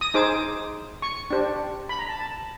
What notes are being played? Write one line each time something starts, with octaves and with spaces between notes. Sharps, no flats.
D#6
D#4 G#4 C5 D6
C#6
D4 G4 C5
B5
A#5
A5
A5